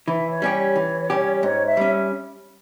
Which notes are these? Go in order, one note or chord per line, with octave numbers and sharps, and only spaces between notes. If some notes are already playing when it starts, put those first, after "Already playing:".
E3 E5
C#5
G3 C#4 G4
C#5
E3
G3 C#4 G4
G#2 C#5
E5
G3 C#4